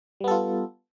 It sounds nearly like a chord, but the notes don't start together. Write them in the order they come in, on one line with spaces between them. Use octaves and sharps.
G3 B3 A4 F4